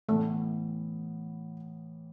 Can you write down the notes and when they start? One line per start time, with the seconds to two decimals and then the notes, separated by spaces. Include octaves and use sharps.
0.08 A2 E3 A3 B3